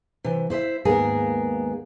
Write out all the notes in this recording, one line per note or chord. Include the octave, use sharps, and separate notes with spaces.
C3 E3
E4 C5 D#5 E5
D#2 G#2 A#3 B3 G#4 A#4